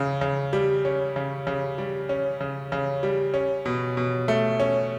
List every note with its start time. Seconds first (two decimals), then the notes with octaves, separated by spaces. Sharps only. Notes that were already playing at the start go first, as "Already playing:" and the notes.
Already playing: C#3
0.21 C#3
0.53 G3
0.85 C#4
1.16 C#3
1.47 C#3
1.78 G3
2.09 C#4
2.41 C#3
2.72 C#3
3.03 G3
3.34 C#4
3.65 B2
3.97 B2
4.28 A3
4.60 C#4